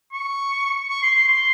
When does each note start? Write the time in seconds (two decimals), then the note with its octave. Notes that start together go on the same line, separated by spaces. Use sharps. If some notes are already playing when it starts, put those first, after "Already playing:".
0.13 C#6
0.90 C#6
1.03 C6
1.15 C6
1.28 C6